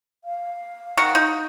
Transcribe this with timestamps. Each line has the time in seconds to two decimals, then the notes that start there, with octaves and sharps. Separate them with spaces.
0.24 F5
0.97 D#3 F#4 C#6
1.15 D#4